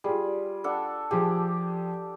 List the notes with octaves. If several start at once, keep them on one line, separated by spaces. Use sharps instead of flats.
G3 F4 G#4
D4 A4 F#5
F3 G4 G#4